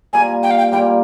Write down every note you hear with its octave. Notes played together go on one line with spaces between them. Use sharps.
A#2 G3 A#3 F4 G#5
G5
F5
G5
A#2 G3 A#3 F4 G5